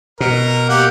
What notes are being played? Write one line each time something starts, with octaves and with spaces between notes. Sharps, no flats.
B2 A#4
A#3 G4 F#5